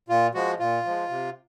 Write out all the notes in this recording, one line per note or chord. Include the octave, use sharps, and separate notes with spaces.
A#2 F4
F3 G#3 F#4
A#2 F4
F3 G#3
C3